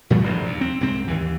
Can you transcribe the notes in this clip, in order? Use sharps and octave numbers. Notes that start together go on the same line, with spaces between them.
A#2 E3 G3 A3
F1 A#1 G2
D#2
C4
C2 G#2 C4
D#2 E3